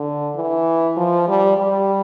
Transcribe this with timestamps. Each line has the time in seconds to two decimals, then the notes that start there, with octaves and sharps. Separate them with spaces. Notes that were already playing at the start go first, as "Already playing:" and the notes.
Already playing: D3
0.36 E3
0.97 F3
1.28 G3
1.57 G3